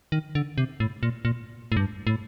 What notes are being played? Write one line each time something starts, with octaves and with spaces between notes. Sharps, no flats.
D#3
D3
C3
A2
A#2
A#2
A2
G2
A2